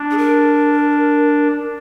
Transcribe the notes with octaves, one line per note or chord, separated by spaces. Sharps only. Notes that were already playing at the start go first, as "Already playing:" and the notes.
Already playing: D4
G#4
A#4